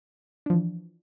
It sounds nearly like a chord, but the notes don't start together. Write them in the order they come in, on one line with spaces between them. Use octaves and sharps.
D4 F3 E3